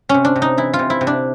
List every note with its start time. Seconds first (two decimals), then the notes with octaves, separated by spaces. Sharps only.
0.09 C3 C#4
0.25 D4
0.36 C3
0.42 D#4
0.57 E3 E4
0.73 F4
0.79 C3
0.90 E4
1.01 C3
1.07 D4